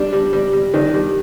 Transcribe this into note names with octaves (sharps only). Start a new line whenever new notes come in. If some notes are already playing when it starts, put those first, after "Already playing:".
Already playing: G3 D4
G3
G3
G3
D#3 D4
G3